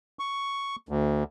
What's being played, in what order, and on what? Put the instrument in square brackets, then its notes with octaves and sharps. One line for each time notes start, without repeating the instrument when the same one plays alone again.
[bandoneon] C#6
D2